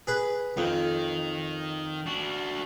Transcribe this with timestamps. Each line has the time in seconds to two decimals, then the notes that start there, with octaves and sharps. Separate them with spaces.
0.07 G#4 B4
0.57 F2 D#3
2.06 D4 F#4